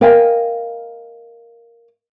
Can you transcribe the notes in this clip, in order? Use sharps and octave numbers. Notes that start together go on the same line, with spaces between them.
A#4 D#5 F5 G5 G#5